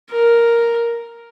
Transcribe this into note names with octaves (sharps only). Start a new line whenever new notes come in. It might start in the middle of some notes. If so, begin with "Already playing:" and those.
A#4